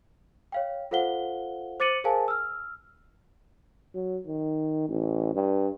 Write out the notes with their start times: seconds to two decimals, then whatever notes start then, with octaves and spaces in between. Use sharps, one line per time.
0.52 C#5 F5 G5
0.91 F4 A4 C5 F5 F#5 G7
1.80 C5 D6 A6 C#7 D#7 F#7
2.04 G#4 A#4 C5 F5 G#5 A5
2.28 E6 F6
3.95 F#3
4.27 D#3
4.89 A1
5.35 G2